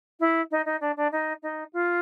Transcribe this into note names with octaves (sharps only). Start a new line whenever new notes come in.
E4
D#4
D#4
D4
D4
D#4
D#4
F4